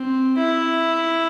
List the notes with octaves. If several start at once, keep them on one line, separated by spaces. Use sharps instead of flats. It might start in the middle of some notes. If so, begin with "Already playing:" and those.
Already playing: C4
E4